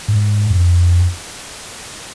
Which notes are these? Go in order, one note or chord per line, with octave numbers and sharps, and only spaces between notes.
G#2
F2